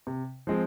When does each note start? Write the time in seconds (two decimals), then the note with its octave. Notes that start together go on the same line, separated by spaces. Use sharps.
0.07 C3
0.47 F3 G#3 C4